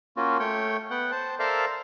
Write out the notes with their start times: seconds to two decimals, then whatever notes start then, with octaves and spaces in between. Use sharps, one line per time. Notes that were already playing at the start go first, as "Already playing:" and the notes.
0.17 A#3 C#4 F4 F#4
0.39 A3 C#5 G5
0.91 B3 F#5 G5
1.11 C5 A5
1.39 A4 A#4 C5 D5 E5 F5